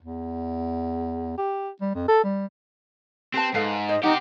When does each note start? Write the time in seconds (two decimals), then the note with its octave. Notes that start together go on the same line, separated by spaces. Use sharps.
0.02 E2
1.38 G4
1.81 G3
1.95 F2
2.08 A4
2.24 G3
3.34 C4 G4 B4 A5
3.54 G#2 A4 B4 F5
3.89 C5 D#5
4.03 C4 D#4 G4 F#5